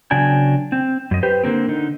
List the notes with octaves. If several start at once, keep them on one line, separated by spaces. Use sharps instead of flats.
C#3 F#3 B3 D4 G5 G#5
C4
F#2 D#5
G4 B4 C5
D3 A#3 C4
D3 D#4